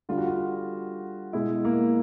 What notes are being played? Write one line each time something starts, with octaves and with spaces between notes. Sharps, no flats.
D3 G3 F4
F#4
F4
B2 G#3 E4
A#3